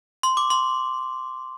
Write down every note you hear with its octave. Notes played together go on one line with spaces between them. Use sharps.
C6
D6
C6